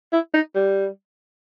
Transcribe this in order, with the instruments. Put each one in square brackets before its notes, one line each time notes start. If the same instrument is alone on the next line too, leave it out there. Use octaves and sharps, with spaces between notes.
[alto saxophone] E4
D#4
G3